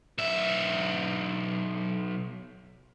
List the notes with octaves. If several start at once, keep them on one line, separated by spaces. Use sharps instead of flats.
B1 E5